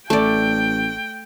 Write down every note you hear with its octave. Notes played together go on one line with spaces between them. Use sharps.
A1 A3 D5 G5